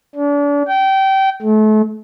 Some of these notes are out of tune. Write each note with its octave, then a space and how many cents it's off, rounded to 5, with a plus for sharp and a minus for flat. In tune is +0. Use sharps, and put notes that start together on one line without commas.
D4 -35
G5 -25
A3 -35